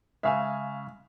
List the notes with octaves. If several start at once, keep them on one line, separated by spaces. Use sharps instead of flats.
C#3 G#3 E5 F5 G#5